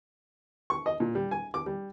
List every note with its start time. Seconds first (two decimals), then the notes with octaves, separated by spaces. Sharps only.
0.70 C#6
0.86 D#5
1.00 A#2
1.15 G3
1.31 G#5
1.54 D6
1.66 G3